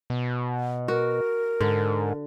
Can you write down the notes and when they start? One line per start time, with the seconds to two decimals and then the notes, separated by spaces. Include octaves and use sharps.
0.10 B2
0.88 F#4 A#4
1.61 G#2 D3